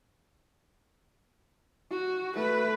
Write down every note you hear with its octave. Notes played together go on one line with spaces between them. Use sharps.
F#4
A3 B4